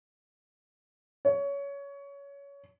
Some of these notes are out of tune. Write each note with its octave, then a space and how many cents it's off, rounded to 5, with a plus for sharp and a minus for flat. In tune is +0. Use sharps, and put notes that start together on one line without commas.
C#5 +20